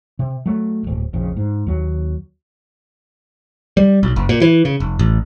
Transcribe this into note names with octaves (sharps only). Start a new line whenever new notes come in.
C3
F#3 A3
D1 G1
A#1 F2 C#3
G#2
D#2 F#3
G3
B1
F#1
A#2
E3
C#3
F1
A1